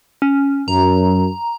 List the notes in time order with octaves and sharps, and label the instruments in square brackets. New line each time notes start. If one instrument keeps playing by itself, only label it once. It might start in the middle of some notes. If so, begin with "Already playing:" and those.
[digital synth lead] C#4
[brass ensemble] F#2 [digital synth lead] A#5